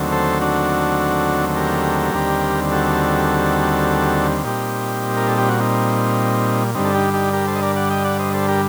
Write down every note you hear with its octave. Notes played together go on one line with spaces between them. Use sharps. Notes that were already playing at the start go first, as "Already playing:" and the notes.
Already playing: D#2 D3 F#3 A3 C4
A4 C5
D4 F#4
G4 A#4
D#2 D3 G3 C4
F#4 A4
A#2 G3 C4 D#4 G4
A#4
A4
G4
F#4
C4 D#4
G2 D3 G3 C4 D#4
A4
D#4 G4
D#4 G4
G4 A#4
A4 C5
D#5
A#4 D5
D5 F#5
D#5 G5
D5 F#5
C5 D#5
A4 C5
G4 A#4